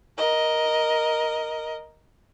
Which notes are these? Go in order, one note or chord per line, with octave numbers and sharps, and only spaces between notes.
A#4 D#5